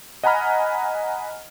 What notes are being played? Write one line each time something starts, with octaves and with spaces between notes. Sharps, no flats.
D#5 F#5 G#5 A#5 B5 F6